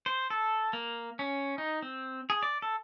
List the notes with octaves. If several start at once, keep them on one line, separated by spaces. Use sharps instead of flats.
C5
A4
A#3
C#4
D#4
C4
G#4
D5
A4